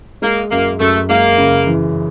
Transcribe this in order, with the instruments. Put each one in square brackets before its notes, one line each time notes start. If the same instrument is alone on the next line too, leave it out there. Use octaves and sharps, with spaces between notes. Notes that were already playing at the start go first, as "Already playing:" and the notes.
[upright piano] G#3 [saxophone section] A#3
[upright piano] F#2 [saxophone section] A#3
[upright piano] F#2 [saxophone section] A3
[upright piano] G#3 [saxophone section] A#3
[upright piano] C#3
E3